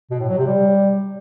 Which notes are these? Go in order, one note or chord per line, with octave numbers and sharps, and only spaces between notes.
B2
A2
F#3
C3
G3